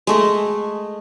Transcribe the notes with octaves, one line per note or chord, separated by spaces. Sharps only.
G#3 A3 D#5